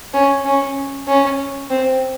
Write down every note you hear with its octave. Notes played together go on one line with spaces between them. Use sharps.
C#4
C#4
C#4
C4